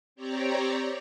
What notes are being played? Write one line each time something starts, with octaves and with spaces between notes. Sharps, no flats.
C4 G4 C#5 D5 A#5